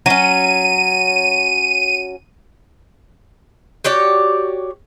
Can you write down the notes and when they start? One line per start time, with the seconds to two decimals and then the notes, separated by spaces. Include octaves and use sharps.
0.06 F#3 C#4 D#7
3.85 F#4 G4 C#5 D5